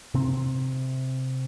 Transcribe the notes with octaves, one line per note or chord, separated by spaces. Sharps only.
C3 C4